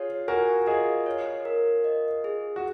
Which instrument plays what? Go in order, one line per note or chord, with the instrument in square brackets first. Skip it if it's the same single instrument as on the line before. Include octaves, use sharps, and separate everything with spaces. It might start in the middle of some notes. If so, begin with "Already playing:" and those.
Already playing: [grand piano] F4 G#4 [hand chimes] C#5
[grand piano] F#4 A#4 [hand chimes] G#5
[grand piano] F4 G#4 [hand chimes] D#5
[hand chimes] C#5
A#4
D#5
G#4
[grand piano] F#4